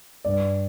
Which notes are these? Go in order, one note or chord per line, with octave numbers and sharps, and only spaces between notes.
G2 D5